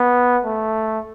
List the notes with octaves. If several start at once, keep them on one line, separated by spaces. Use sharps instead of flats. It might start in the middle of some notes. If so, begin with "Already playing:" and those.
Already playing: B3
A3